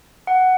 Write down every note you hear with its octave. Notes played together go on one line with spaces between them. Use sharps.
F#5